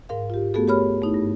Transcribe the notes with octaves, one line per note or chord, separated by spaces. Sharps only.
G#2 A#4 F5
F4 G4
A3 B3 F#4 G#4 A4
G4 A#4 C#5 B5 F6
A3 D#4 E4
G2